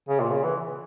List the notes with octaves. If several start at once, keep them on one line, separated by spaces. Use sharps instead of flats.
C#3
A#2
C#3
E3